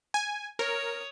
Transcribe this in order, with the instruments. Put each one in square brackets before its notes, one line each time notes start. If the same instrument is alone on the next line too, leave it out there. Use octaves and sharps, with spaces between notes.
[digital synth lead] G#5
[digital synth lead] A#4 [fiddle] C#5 D#6